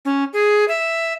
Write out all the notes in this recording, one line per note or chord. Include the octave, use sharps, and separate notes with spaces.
C#4
G#4
E5